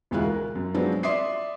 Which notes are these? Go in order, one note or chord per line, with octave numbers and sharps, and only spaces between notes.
E1 D2 G#3 E4 F4 F#6
A#4
F#2
F3 F#3 G#3 B3 C4 D4
D5 E5 C6 D6 D#6 C7